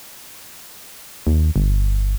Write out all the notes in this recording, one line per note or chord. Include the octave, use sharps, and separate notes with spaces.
D#2
G1